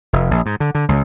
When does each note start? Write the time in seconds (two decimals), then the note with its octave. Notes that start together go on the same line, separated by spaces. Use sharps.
0.13 F1
0.31 A#1
0.46 G#2
0.60 D3
0.75 D3
0.89 C#2